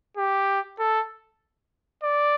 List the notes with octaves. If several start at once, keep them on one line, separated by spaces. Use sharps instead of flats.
G4
A4
D5